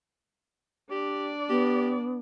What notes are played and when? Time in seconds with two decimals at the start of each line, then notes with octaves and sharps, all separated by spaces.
0.91 D4 G4 D5
1.49 B3 G4